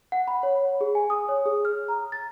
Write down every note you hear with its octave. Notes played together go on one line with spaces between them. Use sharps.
F#5
B5
C#5
G#4
G#5
D#6
C#5
G#4
F6
A#5
A6